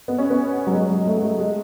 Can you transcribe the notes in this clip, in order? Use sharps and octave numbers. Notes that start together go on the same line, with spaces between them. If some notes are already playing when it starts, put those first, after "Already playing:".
B3
C#4
B3
F#3
G#3
F#3
A3
A3
G#3